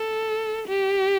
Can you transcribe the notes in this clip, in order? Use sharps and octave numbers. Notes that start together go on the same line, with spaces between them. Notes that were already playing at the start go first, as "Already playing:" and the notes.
Already playing: A4
G4